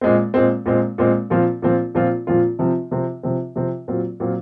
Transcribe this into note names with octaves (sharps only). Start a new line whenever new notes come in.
A#2 G#3 C4
A#2 G#3 C4
A#2 G#3 C4
A#2 G#3 C4
A#2 F3 C4 F4
A#2 F3 C4 F4
A#2 F3 C4 F4
A#2 F3 C4 F4
C3 F3 C4
C3 F3 C4
C3 F3 C4
C3 F3 C4
A#2 F#3 C4 F4
A#2 F#3 C4 F4